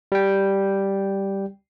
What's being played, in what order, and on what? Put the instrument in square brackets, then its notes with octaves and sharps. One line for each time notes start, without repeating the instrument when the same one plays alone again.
[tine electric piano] G3 G5